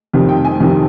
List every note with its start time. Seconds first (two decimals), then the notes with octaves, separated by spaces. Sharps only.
0.13 F2 C3 D#3 G3
0.29 G5
0.45 G#5
0.60 F2 C3 D#3 G3